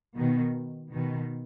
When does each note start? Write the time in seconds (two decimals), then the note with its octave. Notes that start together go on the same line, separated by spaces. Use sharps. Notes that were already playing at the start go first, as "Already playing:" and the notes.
0.16 B2 D#3
0.93 B2 D#3